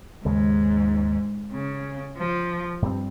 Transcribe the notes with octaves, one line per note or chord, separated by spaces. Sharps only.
D#2 G#2 C#3 G#3
C#3
F3
G2 G3 C4